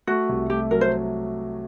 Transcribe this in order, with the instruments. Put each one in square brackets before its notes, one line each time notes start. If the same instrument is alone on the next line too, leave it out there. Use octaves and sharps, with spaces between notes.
[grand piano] A3 [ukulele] F#4
[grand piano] C2
[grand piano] A3 [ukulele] G4
[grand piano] F#3 [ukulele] A#4
[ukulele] C5